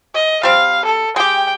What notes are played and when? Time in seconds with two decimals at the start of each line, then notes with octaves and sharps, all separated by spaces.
0.14 D#5
0.43 G3 C4 F5
0.84 A4
1.16 G#3 G4 G5